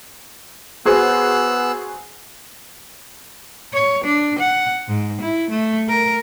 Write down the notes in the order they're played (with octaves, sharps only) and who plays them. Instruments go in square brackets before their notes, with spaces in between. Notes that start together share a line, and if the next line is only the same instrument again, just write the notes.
[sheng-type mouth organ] B3 E6 F#6 [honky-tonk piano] F#4 G#4 C5
[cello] C#5
D4
F#5
G#2
E4
A3
A#4